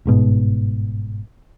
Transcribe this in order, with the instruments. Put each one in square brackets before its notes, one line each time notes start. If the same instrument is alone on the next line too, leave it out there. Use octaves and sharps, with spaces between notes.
[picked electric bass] G1 G#2 B2